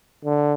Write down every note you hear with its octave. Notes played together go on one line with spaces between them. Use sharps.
D3